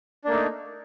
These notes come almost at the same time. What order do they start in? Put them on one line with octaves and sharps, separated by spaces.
D4 A#3 A3 D#4